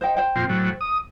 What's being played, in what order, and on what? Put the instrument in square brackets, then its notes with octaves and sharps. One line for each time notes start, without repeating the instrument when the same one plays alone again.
[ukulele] C5 D#5 G5
C5 G5
[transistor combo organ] F2 A#2 C4
A2 F#3
D#6